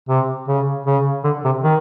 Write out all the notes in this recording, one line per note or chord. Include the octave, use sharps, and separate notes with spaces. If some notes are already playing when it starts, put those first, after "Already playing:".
C3
C#3
C#3
D3
C3
D#3